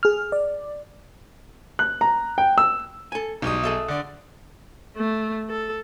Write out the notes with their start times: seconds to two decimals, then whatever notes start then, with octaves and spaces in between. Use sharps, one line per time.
0.03 G#4 F6
0.32 D5
1.79 F#6
2.01 A#5
2.38 G5
2.58 E6
3.12 A4 G#5
3.42 B1 G3 G#3 D#4 D#6
3.63 G#4 A4 E5
3.88 D3 D5
4.97 A3
5.50 A4